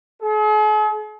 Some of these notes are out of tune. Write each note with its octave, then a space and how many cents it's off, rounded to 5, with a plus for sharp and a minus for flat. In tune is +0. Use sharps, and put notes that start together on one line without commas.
G#4 +45